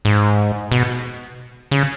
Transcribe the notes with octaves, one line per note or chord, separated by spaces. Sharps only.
G#2
B2
C#3